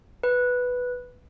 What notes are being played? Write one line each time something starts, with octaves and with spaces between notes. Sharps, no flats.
B4